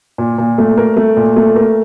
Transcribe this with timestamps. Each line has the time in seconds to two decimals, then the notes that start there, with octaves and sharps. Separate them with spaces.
0.18 A#2
0.38 A#2
0.58 A3
0.78 A#4
0.97 A3
1.17 A#2
1.36 A3
1.56 A#4